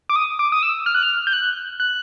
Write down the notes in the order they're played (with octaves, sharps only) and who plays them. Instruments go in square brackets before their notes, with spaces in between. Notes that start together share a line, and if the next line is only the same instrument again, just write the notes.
[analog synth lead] D6
D#6
D6
D#6
E6
F6
F#6
F6
G6
F#6
F#6